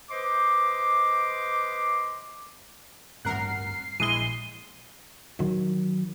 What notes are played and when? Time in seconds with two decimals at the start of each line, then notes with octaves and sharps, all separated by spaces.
0.10 B4 C5 D#5 C6 D6
3.25 A1 D2 G2 C4 A#4 F#5 C7
4.00 A#1 E3 G#3 D#7 G7
5.39 D#3 F#3